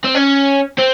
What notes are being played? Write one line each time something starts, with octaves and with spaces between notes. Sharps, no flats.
C4
C#4
C4